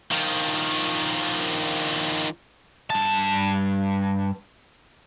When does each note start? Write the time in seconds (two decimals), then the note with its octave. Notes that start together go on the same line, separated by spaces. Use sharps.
0.11 D#3 F3
2.90 G2 A5